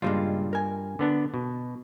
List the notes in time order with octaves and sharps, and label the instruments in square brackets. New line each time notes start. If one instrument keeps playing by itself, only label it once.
[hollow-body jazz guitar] C#2 A#2 G#3 [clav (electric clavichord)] G2 G3 F4
[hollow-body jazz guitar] A#4 G#5
[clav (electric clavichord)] D3 B3 D4
B2